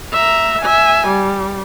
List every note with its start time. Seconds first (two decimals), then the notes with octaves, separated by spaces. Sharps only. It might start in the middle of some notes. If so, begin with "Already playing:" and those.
0.13 E5 A#5
0.61 E5 G#5
1.08 G3